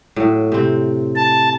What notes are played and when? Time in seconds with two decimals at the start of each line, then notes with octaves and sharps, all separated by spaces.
0.16 A2 F#3
0.52 C3 C4
1.16 A5